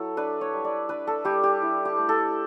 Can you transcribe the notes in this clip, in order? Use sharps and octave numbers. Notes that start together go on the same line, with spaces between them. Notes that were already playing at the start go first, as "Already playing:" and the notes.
Already playing: F#3 E4 A4
D4 B4
C#5
G3
D5
D4 B4
A4
G3 G4
G4
E4
G4
A3
A4